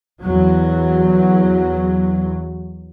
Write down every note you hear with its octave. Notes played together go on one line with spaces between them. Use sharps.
E2 F#3